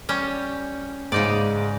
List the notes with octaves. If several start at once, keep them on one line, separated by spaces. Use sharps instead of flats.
G3 C#4
G#2 C#3 G#3 D#4 D5